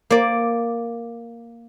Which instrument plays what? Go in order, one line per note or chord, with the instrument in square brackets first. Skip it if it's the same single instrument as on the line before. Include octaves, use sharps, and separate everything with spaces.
[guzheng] A#3 D5